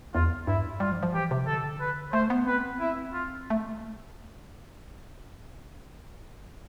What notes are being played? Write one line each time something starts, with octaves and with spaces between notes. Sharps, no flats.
E2 F4
G2 E4
G3 F4
F3
F3
E3 G4
C3
D3 A4
B4
A3 C5
B3
C4 B4
E4
F4
A3